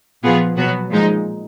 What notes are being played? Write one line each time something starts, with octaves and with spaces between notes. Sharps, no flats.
A#2 F3 B3 F4 G#4
B2 F#3 B3 F#4
A#2 F3 G#3 D#4